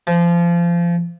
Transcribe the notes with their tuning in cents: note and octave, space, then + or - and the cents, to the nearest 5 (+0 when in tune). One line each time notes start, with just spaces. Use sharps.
F3 -25